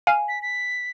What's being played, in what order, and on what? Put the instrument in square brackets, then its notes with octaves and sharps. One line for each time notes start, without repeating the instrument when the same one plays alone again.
[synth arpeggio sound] F5 [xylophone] G#5
[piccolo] B6
B6